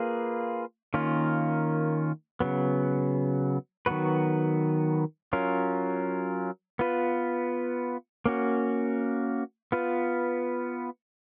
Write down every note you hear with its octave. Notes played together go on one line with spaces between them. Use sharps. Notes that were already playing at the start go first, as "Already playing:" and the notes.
Already playing: A#3 F4 G#4 B4
D#3 A#3 C#4 F4
C#3 F#3 B3
D#3 F#3 B3 F#4 B4
F#3 C#4 F4 A#4
B3 F4 B4
A#3 C#4 F#4
B3 F4 B4